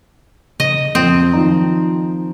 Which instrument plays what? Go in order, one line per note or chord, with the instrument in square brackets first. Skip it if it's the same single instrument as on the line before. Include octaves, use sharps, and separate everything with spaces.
[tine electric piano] C#3 [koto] D#5
[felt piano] F2 [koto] C4 [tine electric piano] D#6
[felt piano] D#3 F3 [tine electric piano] A#5